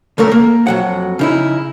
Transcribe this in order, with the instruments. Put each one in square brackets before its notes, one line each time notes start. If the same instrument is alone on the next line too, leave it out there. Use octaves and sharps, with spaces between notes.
[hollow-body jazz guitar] C#2 F#2 A3 A#4
A#3
F2 F#3 F#5
C#3 D#4 E4